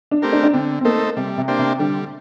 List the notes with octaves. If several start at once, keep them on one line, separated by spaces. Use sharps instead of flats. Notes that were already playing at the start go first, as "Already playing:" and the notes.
D4
A3 C4 G4 A#4
D4
D4
D3 C4
C4
A3 A#3 D#4 A4 C5
C3 G3
C3
A#3 D4 G4 C5
C3
D3 G3